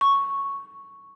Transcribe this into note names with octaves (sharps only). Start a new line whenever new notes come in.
C#6